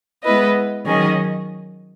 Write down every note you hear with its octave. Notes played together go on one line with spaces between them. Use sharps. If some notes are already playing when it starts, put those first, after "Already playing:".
G#3 B3 E4 B4 D#5
D#3 F#3 C#4 G#4 D#5